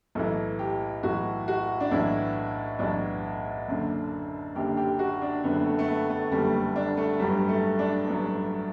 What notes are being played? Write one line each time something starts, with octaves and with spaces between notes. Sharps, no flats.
B1 A2 E3 A4
G4
B1 A2 E3 F#4
F#4
D4
B1 A2 E3 E4
B1 A2 E3 D4
F#1 F#2 D3
F#1 F#2 D3 G4
G4
F#4
D4
F#1 F#2 D3 B3
A3
A3
B3
A3
F#1 F#2 D3 G3
A3
D4
A3
A1 G2 F#3 G3
A3
D4
A1 G2 F#3